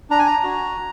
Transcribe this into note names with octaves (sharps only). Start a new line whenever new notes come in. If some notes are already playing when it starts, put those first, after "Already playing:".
D4 A#5
G#5
A#5
F#4